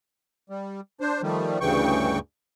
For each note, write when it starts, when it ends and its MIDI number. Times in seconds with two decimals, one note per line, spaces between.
0.50 0.81 55
1.01 1.22 62
1.01 1.22 72
1.23 1.59 51
1.23 1.59 53
1.23 1.59 55
1.23 1.59 57
1.61 2.19 38
1.61 2.19 43
1.61 2.19 49
1.61 2.19 52
1.61 2.19 79
1.61 2.19 85